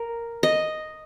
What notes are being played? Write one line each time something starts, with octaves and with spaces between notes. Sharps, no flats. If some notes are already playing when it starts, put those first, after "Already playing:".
Already playing: A#4
D#5